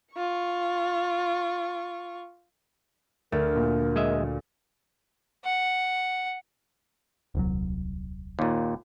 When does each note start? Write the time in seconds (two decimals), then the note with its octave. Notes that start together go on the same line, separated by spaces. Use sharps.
0.14 F4 C#6
3.32 D2 A3 A#4
3.56 A#2
3.96 G#3 D#5 E5
5.45 F#5
7.35 D#1 C2 F#3
8.39 D#2 A#2